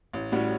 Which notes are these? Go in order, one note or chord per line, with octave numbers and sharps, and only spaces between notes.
A1
A2 G3 C#4 F#4